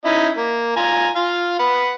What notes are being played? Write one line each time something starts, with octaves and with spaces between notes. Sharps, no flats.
C#4 D#4 E4
A#3
F4 G#5 A#5
F4 F5
B4 F#5